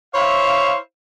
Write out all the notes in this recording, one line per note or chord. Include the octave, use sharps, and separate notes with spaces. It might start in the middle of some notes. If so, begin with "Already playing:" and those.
E4 C5 C#5 E5 F5